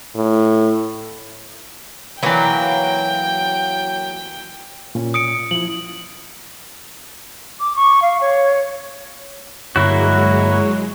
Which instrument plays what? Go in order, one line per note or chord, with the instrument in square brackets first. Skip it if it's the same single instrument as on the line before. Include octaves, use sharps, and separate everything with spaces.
[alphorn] A2
[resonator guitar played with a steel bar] E3 B4 [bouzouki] F#3 A#3 [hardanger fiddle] G5
[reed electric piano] A#2 C#4
[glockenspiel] D#6 C#7 D7
[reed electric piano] F3 E4 [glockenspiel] F#7
[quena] D6
C#6
F5
C#5
[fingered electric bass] G2 D3 [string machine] F#3 G#3 [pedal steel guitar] A#3 E4 F#4 [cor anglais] C#5